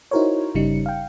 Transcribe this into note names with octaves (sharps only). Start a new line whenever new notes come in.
D#4 E4 F#4 A#4 C5 C#5
G1 C#3 G3 D#4 C#7
F5 G5